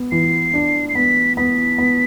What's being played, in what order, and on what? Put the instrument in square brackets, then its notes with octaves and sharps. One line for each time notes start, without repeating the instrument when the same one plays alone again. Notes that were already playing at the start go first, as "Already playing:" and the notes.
Already playing: [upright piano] B3
[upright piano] E3 [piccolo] C7
[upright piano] D4
[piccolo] C7
[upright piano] B3 [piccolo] B6
[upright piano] B3 [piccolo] B6
[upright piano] B3